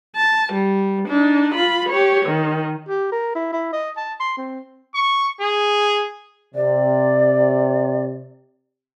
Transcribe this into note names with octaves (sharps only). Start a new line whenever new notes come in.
A5
G3
D4 D#4
F4 B5
G4 C#5
D#3
G4
A#4
E4
E4
D#5
A5
C6
C4
C#6
G#4
C3 D5